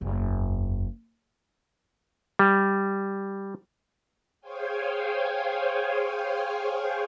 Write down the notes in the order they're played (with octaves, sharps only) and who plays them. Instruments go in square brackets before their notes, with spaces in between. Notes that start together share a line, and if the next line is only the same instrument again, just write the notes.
[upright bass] F#1 E2
[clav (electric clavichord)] G3
[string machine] G#4 C5 C#5 F5 G5 G#5